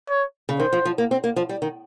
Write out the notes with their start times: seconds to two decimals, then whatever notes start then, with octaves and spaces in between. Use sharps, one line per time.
0.09 C#5
0.49 C#3
0.59 D#3 C5
0.73 F3
0.85 F3
0.98 A#3
1.11 C4
1.24 A#3
1.36 F3
1.49 G3
1.62 D#3